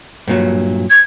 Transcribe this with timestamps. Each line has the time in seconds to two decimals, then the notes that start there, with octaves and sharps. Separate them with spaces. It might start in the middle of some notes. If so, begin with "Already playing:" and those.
0.28 G2 A#2 F#3
0.90 G#6